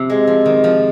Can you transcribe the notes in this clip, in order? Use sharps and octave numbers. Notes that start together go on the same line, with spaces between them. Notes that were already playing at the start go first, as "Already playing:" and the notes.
Already playing: C3 F3
G#3
F3
D#3
F3